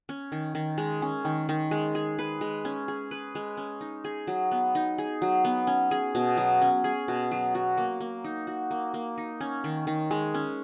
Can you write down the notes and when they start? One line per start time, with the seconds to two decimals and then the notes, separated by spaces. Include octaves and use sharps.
0.09 C#4
0.32 D#3
0.55 D#3
0.78 G#3
1.02 C#4
1.25 D#3
1.49 D#3
1.71 G#3
1.95 G#4
2.19 B4
2.41 G#3
2.65 C#4
2.88 G#4
3.11 B4
3.35 G#3
3.57 C#4
3.81 D#4
4.05 G#4
4.27 F#3
4.51 B3
4.75 D#4
4.98 G#4
5.22 F#3
5.45 B3
5.67 C#4
5.91 G#4
6.15 B2
6.37 F#3
6.62 C#4
6.84 G#4
7.08 B2
7.32 F#3
7.55 F#4
7.77 A#3
8.00 A#3
8.24 D#4
8.47 F#4
8.71 A#3
8.94 A#3
9.18 D#4
9.41 C#4
9.64 D#3
9.87 D#3
10.11 G#3
10.35 C#4